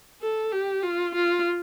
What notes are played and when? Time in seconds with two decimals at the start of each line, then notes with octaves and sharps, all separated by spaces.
0.21 A4
0.52 G4
0.83 F4
1.15 F4